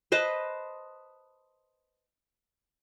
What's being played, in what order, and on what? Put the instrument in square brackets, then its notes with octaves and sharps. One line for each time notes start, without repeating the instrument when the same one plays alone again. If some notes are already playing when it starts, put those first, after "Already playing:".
[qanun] B4 C5 D#5 A5